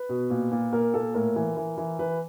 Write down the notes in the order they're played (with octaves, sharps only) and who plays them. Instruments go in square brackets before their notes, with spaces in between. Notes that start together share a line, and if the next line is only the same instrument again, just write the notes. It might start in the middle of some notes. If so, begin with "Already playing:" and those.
Already playing: [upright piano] B4
B2
A#2
A#2
A#2 A#4
A#2 A4
A2 A#4
E3
E3
E3
E3 B4